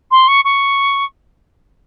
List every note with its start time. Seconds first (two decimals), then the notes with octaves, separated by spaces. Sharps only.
0.11 C6
0.28 C#6
0.45 C#6